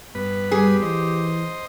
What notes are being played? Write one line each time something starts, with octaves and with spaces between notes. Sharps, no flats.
G2 B3 B4
G3 G4 G#4
E3 C5 D#5